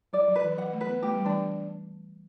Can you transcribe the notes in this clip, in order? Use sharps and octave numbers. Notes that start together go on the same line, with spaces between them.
F#3 D5
F#3
B4
E3
F#3 F#5
A3
B4
B3
A3 G4
G3
E3 D4